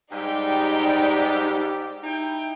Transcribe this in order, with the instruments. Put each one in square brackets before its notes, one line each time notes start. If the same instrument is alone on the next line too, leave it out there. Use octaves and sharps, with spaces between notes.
[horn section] G#2 G3 G4 [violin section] D#4 D5 G5
[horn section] D#4 E4 G5